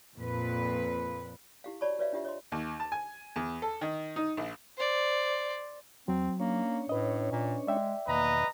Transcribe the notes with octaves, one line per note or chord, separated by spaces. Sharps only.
F2 A#2 B4
E4 G4 F5
F#4 C#5 D5 A5 B5 C#6
F#4 B4 C#5 D5 E5 F5
D4 F4 G4 E5
C#5 D#5 C6
D#2
A5
G#5
E2
A4
D#3
D#4
A#1
C5 D5
E2 F#3 C4
A#3 C#4 D4 C#5
A2 B4 D#5
A#2
G#3 D5 E5 G5
E2 B2 D#3 A#3 B4 D#5 A#5